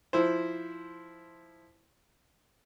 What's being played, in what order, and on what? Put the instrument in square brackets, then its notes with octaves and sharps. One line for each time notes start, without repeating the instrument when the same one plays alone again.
[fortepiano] F3 E4 C5